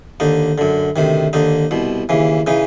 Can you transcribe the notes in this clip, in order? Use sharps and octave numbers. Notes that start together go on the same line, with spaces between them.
D#2 D3 D#4
F#2 D3
D2 C3 D#3
D#2 D3 D#4
C2 B2
D#2 C#3 E3
C#3 E3 D#4